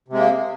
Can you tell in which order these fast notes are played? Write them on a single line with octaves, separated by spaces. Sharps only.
C3 G#3 A#3